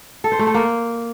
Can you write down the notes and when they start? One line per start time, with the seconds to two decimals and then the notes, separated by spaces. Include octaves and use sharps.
0.24 A4
0.32 C5
0.39 A3
0.47 A4
0.54 A#3